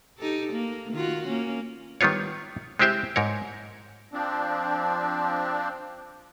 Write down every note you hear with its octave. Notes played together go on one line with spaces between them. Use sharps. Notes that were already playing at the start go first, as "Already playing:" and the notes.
D#4 G4 A4
A#3
D#3 F4 F#4
A#3 C#4
D#3 G3 B3 F4 C#5
G#3 C4 E4 G4 C5 E5
G#2 A#4 C#5
F3 C4 D4